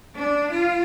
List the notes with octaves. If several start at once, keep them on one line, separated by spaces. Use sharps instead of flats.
D4
F4